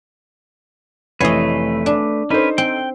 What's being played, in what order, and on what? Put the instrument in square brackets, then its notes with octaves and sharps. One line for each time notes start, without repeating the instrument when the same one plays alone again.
[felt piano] F1 E3 C7 [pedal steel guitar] A3 B4 [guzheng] C#5 D#5
[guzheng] D4
[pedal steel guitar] C#4 B4 [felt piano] D#4 A4 C5
[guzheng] C4 [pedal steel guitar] G5